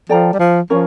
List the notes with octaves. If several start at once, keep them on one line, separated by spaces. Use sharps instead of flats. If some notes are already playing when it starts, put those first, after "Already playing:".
F3 A4 D5 G5 A#5
G3
F3
F3 C#4 F4 A#4 C#5